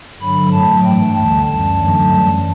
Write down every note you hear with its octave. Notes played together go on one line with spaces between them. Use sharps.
G2 D3 F#3 B5
A2 F#3 A3 A5
G2 E3 A3 G5
D2 D3 G3 A5
F#2 E3 G3 A5
G2 D3 F#3 A3
F#2 E3 G3